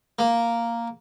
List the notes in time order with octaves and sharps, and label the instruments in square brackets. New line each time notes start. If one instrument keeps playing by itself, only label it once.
[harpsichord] A#3